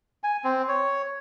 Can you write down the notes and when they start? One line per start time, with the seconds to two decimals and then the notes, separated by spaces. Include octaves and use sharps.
0.23 G#5
0.44 C4
0.68 C#5